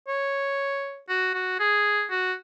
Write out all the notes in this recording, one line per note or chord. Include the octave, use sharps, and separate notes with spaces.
C#5
F#4
F#4
G#4
F#4